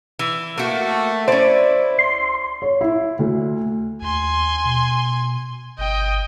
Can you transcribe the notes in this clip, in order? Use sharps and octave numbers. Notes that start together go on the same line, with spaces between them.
E3
A3 A#3 F#4
C#4 E4 C5 D5
C6
C#5
E4
D2
D#2 G#5 C6
B2
G1 D#5 G5